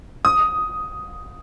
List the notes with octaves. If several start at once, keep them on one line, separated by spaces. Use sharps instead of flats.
D#6